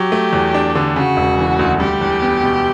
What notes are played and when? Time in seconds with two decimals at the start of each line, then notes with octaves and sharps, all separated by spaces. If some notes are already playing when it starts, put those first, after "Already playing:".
Already playing: F#3 G4
0.12 A3
0.33 E2
0.54 D4
0.75 D3
0.96 C#3 F#4
1.17 E1
1.39 E3
1.59 D2
1.80 G3 G4
2.01 E2
2.22 B3
2.43 B2